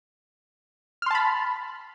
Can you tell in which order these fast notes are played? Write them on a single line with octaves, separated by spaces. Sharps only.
F6 C6 A5 B5